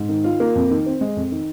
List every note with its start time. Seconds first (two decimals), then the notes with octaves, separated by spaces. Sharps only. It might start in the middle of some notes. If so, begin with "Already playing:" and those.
Already playing: G#2
0.09 D#3
0.24 F4
0.40 A#3
0.55 F2
0.71 D#3
0.86 C4
1.01 G#3
1.17 F2
1.32 D#3